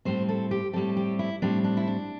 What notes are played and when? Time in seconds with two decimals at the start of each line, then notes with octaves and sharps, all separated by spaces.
0.05 A2 G3 C4 C5
0.29 A4
0.51 G4
0.73 A2 G3 C4 A4
0.97 G4
1.19 E4
1.42 A2 G3 C4 D4
1.64 D4
1.77 E4
1.88 D4